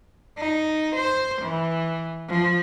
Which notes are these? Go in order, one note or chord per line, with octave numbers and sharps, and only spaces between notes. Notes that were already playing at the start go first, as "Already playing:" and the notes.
D#4
C5
E3
F3